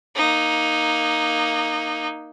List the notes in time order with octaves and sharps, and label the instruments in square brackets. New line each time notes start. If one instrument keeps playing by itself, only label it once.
[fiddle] A#3 D#4